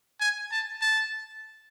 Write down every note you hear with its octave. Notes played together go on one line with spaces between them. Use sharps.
G#5
A5
A5